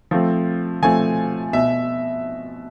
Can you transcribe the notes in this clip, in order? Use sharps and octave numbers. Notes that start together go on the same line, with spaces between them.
F3 A3 C4
F3 A3 C4 G#5
B2 E5